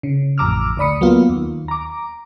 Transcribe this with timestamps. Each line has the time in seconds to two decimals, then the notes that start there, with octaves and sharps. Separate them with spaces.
0.03 C#3
0.38 A1 F2 A#5 D6 E6 F6
0.77 D2 D3 D5 B5 D#6 C#7
1.01 F#3 A#3 B3 F4
1.29 D#2
1.68 A#5 D6